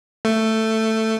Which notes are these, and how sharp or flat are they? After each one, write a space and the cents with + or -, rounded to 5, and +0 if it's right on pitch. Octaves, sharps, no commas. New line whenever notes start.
A3 +10